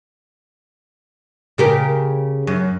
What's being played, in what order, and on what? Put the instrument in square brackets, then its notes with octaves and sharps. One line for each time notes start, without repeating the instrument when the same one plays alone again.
[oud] C#3 G4 A#4
F#2